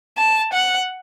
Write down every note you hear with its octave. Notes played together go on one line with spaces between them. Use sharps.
A5
F#5